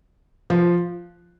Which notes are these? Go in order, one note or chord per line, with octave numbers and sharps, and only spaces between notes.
F3